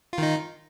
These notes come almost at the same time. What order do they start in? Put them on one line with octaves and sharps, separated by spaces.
F4 D#3 D#4